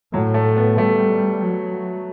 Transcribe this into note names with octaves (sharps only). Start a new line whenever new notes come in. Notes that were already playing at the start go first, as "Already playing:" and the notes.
A2 F#3
A3
B3
G3 A3
F#3